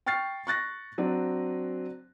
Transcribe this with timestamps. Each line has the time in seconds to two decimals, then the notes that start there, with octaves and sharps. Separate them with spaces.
0.06 G5 C#6 F6 A6 C7
0.47 C#6 F#6 A6 A#6
0.98 F#3 C4 D4